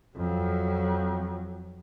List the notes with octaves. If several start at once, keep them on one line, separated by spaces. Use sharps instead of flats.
F2 F#3